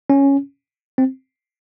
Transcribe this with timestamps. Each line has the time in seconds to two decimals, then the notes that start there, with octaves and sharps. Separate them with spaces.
0.10 C#4
0.98 C4